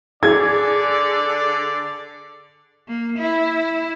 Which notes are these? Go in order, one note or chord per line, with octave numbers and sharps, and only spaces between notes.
D3 G#4 D5 G#6
A#3
E4